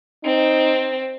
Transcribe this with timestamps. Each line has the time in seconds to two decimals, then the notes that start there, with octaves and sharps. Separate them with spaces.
0.25 C4 D#4